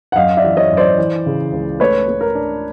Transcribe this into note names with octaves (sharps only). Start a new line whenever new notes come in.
F#5
F#2 D#5 F5
D5 E5
E3
C#5 D#5
F#2
C5 D5
E3
C#3
C#2
A3 B4 C#5
A3
A#4
D4